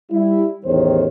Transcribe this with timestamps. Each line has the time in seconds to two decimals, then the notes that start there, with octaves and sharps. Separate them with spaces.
0.11 G3 E4
0.65 A1 E2 D#3 G4 C5 C#5